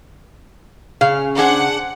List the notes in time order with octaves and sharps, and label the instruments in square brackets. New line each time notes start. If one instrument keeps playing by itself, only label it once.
[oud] C#3 [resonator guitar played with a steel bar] F5
[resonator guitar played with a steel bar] D4 G#4 C5 [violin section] F#5